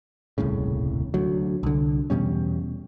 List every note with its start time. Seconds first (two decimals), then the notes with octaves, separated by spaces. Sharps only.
0.38 D#1 C2 A2 C#3
1.14 D2 F#3
1.63 C2 D3
2.10 E2 B2 G3 C#4